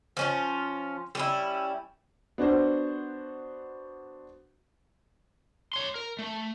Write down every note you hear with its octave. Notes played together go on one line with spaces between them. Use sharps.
F3 C#4 F4
G3 C#4 E4
B3 D4 F#4 C5
C#5 C6
A#4
A3